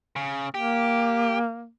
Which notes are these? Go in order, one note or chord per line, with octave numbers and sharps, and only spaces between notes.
C#3
A#3 G4